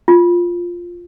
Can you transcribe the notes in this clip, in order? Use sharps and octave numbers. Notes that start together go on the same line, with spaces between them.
F4